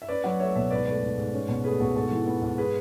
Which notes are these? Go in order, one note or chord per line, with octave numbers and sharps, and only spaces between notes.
E5
C#4 B4 D5
F#3 D5 F#5
A3 C#5 E5
B2 C#5 E5
G#2 B4 D5
A3 B4 D5
G#2
G#2
C#4
B2
A3 G#4 B4
B2 F#4 A4
G#2 F#4 A4
E3
B3
G#2
G#4 B4